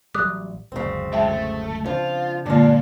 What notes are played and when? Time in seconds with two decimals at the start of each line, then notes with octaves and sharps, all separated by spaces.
0.15 A1 F#3 G3 D6 D#6 F#6
0.72 D1 C#2 F#2 C#3 C4
1.13 G#3 E4 E5 G5 A5
1.28 A3
1.86 C#3 F3 C4 D4 F4
2.46 G2 A#2 D3 G#3 A#3 D4 F4